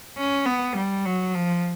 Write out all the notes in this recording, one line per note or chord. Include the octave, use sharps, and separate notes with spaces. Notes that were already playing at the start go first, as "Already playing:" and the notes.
C#4
B3
G3
F#3
F3